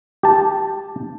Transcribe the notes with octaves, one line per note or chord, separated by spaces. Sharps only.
G4 A5